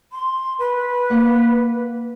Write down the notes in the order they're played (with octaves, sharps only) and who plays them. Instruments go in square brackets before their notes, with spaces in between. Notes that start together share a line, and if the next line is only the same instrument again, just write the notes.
[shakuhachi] C6
B4
[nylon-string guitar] A#3 F#5